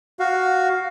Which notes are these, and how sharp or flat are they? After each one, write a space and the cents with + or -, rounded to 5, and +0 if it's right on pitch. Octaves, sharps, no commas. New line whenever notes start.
F#4 +5 F5 +10